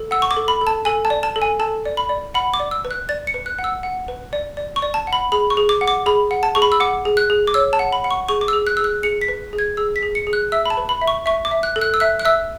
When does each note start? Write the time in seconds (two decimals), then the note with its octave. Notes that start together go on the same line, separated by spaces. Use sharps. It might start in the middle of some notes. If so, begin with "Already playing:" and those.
Already playing: A4
0.11 F#5 E6
0.22 C#6
0.31 D6
0.37 A4
0.48 B5
0.61 A4
0.67 A5
0.85 A4 G#5
1.05 A5
1.10 D5
1.23 A5
1.36 A4
1.42 G#5
1.60 A4 A5
1.86 D5
1.97 B5
2.09 D5
2.34 F#5 B5
2.54 D6
2.60 D5
2.71 E6
2.85 B4
2.91 F#6
3.09 D5 A6
3.27 C#7
3.34 B4
3.46 F#6
3.59 F#5
3.64 E6
3.83 F#5
4.08 B4
4.33 D5
4.57 D5
4.76 C#6
4.82 D5
4.94 A5
5.07 F#5
5.13 B5
5.32 G#4 B5
5.50 C#6
5.57 G#4
5.69 D6
5.81 F#5
5.88 D6
6.06 G#4 B5
6.31 F#5
6.43 A5
6.55 G#4 C#6
6.62 B5
6.72 E6
6.80 F#5 D6
7.05 G#4
7.17 F#6
7.30 G#4
7.47 D6
7.54 C#5 E6
7.73 A5
7.79 F#5
7.92 B5
8.04 F#5
8.11 C#6
8.29 G#4 C#6
8.41 D6
8.48 G#4 E6
8.67 F#6
8.77 G#4 E6
8.84 F#6
9.03 G#4 C#7
9.21 B6
9.28 B4
9.53 G#4
9.59 G#6
9.77 G#4 E6
9.96 B6
10.03 G#4
10.15 C#7
10.27 G#4
10.33 F#6
10.52 E5 E6
10.66 B5
10.70 A5
10.77 B4
10.89 B5
11.01 E5
11.07 C#6
11.26 E5 C#6
11.45 D6
11.51 E5
11.63 F#6
11.76 A4
11.81 F#6
11.94 E6
12.00 E5 F#6
12.20 F#6
12.25 E5 E6